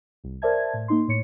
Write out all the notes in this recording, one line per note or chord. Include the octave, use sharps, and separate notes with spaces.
C2
A#4 C5 D5 E5 A5 G#6
A2
A#3 D#4 C6
A2 C#5 C#7